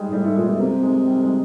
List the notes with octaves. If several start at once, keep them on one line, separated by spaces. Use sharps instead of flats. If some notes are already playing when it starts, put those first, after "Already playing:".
Already playing: G3 G#3
G#2
A2 G3
G#2 A3
A#2 G#3
B2 A3
C3 A#3
G#3
G3
G#3